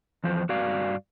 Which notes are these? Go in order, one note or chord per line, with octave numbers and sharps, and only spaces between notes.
E2 F3 C5
G2 F#4 D5 F5